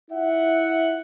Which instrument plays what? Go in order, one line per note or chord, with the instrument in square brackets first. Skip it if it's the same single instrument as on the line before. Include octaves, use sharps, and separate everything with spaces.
[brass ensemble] E4 F4 E5 F#5